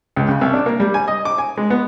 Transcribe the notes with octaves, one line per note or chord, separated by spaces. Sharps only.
C#2
C#3
C2
D4
A#3
G3
G#5
D#5
D6
G#5
G#3
B3